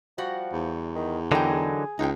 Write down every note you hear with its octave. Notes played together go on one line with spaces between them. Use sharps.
F3 G3 F#4 F#5
E2
D#3
D3 E3 F#3 D#4 G#4 A#4 G5
C#2 D#4 G5